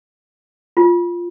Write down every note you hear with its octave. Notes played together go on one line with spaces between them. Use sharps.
F4